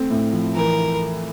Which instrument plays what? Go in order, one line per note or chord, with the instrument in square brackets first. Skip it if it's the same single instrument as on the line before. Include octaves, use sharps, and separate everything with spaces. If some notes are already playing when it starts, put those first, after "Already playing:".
Already playing: [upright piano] A3 C4
A2
F3
[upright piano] E3 [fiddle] A#4